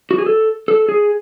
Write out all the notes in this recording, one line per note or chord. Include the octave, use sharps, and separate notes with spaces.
F#4
G#4
A4
A4
G#4